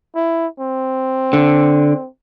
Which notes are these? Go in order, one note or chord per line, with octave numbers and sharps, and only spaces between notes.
E4
C4
D3